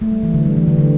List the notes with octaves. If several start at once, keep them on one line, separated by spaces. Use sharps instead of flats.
A3
G3
E3
D3
G3
E3
D3
D3